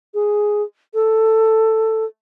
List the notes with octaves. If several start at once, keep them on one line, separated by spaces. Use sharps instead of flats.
G#4
A4